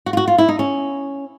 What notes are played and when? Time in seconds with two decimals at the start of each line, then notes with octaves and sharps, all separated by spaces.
0.06 F#4
0.13 F4
0.17 F#4
0.28 F4
0.38 E4
0.48 D#4
0.59 C#4